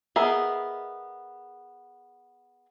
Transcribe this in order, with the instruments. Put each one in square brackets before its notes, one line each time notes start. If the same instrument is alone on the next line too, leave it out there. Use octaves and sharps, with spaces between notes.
[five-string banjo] B3 G#4 A#4 D#5 E5